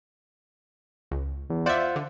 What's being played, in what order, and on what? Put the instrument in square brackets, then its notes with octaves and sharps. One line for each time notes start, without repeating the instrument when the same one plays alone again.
[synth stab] C#2
[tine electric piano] E2
[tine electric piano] F4 C5 F#5 [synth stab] D5 E5
[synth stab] D3